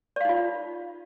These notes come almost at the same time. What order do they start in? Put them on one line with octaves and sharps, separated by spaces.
D5 F5 D#4 F4